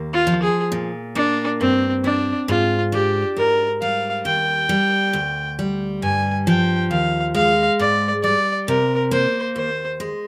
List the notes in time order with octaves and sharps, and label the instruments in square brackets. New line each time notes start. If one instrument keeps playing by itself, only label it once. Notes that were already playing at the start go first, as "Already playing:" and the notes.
Already playing: [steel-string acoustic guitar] D#2 A#3
[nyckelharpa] F4
[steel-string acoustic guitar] F3
[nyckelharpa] G#4
[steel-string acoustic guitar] A#2
[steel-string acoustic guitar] A#3 [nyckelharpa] D4
[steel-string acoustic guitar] G2 [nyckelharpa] C4
[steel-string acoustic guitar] C4 [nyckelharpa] D4
[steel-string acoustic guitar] G#2 [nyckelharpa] F4
[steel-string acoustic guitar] D4 [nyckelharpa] G4
[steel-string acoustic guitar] G#2 [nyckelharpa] A#4
[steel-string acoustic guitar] G3 [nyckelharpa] F5
[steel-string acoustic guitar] D#2 [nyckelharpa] G5
[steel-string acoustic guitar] G3
D2
G3
[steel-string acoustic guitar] G2 [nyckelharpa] G#5
[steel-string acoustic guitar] F3 [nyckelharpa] G5
[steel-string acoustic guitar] D#2 [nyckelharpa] F5
[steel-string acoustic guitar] G#3 [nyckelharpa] F5
[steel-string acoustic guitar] G#2 [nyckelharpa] D5
[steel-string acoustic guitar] G3 [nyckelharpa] D5
[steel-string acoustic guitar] C3 [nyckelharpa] A#4
[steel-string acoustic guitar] A#3 [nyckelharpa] C5
[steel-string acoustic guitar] D#2 [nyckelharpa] C5
[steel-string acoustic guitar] G#3